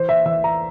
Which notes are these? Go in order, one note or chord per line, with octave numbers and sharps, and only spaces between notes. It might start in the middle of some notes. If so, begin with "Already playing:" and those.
Already playing: E3 C5
E5
E3 E5
A#5